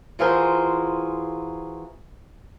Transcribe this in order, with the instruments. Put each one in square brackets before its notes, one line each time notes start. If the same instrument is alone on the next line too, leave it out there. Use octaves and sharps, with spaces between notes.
[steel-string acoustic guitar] E3 F4 F#4 G#4 A#4 C5